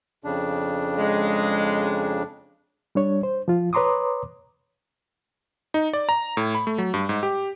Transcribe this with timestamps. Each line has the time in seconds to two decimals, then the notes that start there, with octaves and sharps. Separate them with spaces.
0.24 F2 C#3 D4
0.98 G#3
2.95 G3 D4 C#5
3.23 C5
3.48 F3 F4
3.73 B4 C#5 A#5 C6 D6 D#6
5.74 D#4
5.93 D5
6.09 A#5
6.37 A2
6.55 B5
6.67 A3
6.78 F#3
6.94 G2
7.09 G#2
7.23 G4